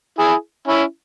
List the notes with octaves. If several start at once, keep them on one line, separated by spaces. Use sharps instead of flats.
E4 G#4
C#4 E4